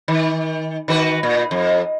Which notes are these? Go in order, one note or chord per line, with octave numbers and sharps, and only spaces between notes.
D#3
D#3 F#4 B4
A#2
F2